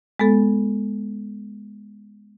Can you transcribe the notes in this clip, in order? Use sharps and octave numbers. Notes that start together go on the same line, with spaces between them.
G#3 B3 A4